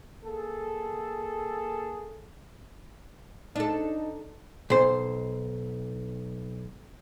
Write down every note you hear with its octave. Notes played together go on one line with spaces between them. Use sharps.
A#3 G#4 A4
D4 D#4 A4
B1 C5